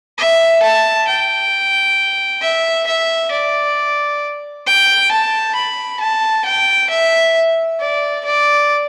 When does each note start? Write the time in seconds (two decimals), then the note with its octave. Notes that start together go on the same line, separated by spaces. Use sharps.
0.18 E5
0.63 A5
1.08 G5
2.41 E5
2.87 E5
3.31 D5
4.67 G5
5.11 A5
5.55 B5
6.00 A5
6.45 G5
6.90 E5
7.80 D5
8.25 D5